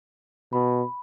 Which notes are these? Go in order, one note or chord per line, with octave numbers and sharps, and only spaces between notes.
B2 B5